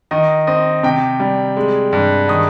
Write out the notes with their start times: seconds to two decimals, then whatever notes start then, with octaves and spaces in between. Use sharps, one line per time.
0.11 D#3 D#5
0.47 C4 D#5
0.83 C3 G5
1.20 G3
1.57 G#3
1.93 G2
2.28 D#3 D#6